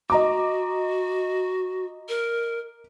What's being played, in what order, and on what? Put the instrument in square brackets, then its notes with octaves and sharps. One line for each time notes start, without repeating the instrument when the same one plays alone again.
[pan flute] F#4 [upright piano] D#5 A#5 D6
[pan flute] A#4